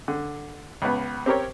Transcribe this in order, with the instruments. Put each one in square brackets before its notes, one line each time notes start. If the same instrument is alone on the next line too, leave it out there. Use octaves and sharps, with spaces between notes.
[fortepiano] D3
C#2 B3
C4 G4 A#4 C#5